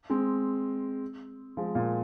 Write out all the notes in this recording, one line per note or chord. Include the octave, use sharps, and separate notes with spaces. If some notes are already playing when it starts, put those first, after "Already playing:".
G#3 C4
F3 G#3
A#2